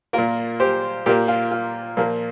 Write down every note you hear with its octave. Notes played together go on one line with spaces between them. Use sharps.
A#2 A#3 F4 A#4
G4 C5
A#2 A#3 G4
F4
F4
A#2 F3 A#3